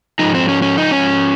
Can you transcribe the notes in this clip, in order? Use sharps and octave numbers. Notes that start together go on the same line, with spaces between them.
G#2 F3 D#4
C4
C#4
C#4
D#4
C#4